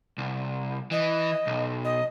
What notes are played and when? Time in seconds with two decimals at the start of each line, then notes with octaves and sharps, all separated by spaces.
0.18 C2
0.91 E3 D#5
1.47 B1
1.84 D#5